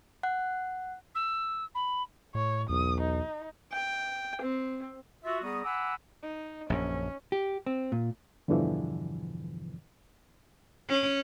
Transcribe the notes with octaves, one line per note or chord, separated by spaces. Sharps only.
F#5 F#6
E6
B5
A2 C#5
B1 E2 D#6
D#4
G5
C4
F4 F#4 E5
G3 B3 G#4 A#5 C#6 D#6
F#5 G#5 A#5 B5 D6 E6
D#4
A#1 F#2 C#4
G4
C4
A#2
E2 G2 B2 D3 E3 F3
C#4